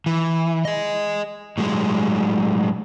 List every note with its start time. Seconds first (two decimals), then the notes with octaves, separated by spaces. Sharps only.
0.06 E3
0.65 G#4 D#5
1.58 A2 F#3 G#3